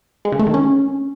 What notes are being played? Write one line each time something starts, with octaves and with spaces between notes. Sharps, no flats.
G#3
C#3
A3
D#3
C#4